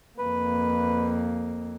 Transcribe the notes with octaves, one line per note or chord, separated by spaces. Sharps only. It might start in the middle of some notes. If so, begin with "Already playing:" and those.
F2 A#3 B4